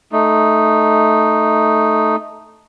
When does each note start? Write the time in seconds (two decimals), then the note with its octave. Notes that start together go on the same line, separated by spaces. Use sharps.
0.12 A3 D#4